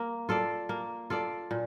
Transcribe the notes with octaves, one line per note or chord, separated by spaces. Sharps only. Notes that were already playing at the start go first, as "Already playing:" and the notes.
Already playing: A#3
F4 A4 D5
A#3
F4 A4 D5
A#2